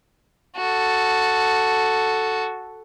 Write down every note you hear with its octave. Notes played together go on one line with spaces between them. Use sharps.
F#4 A4